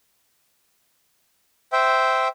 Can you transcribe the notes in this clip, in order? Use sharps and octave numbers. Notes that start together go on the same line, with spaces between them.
C5 E5 G5